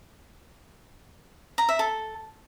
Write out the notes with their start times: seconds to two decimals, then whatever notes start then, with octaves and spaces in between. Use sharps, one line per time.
1.58 A#5
1.69 E5
1.79 A4